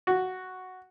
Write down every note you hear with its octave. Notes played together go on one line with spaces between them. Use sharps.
F#4